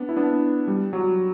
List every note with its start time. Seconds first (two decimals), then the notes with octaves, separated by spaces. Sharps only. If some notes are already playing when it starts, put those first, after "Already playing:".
Already playing: B3 D4
0.09 E4
0.17 B3 D4
0.68 G3
0.93 F#3